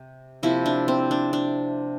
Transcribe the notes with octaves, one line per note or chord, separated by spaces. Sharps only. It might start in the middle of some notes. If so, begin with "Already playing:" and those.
Already playing: C3
C3 F3 A#3 E4
D4
C4
D4
D4